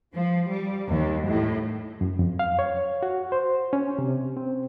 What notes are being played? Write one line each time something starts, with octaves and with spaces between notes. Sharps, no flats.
F3
G3
D#2
A2
F#2
F2
F5
C#5
F#4
C5
C#4
C3
C4